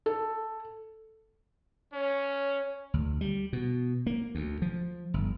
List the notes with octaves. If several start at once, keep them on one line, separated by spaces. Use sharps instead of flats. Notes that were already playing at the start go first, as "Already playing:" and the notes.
A4
C#4 C#5
D2
G3
B2
A#3
D2
F3
G1